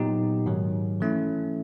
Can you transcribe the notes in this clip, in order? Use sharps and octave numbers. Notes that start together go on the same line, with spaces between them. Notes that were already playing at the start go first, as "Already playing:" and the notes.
Already playing: A#2 F#3 B3 D#4 G4
G#2 D#3 F#3
E3 A3 C#4 E4